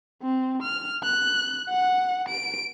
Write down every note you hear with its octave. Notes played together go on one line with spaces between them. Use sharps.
C4
F6
F#6
F#5
D7